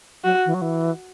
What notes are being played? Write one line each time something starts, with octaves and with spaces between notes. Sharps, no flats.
F#3 F#4
E3
F#3
E3